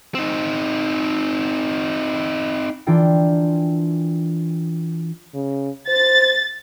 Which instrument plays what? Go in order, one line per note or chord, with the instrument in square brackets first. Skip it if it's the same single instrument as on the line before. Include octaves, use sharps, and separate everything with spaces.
[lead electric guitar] C4 D#4
[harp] E3 D4 F4 A#4 G5
[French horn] C#3
[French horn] C5 [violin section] A6